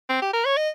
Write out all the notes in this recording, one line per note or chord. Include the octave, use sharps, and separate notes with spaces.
C4
G4
A#4
C#5
D#5